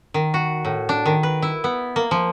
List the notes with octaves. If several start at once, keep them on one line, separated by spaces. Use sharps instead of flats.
D#3
F#4
A2
D4
D#3
B4
E4
B3
A#3
F3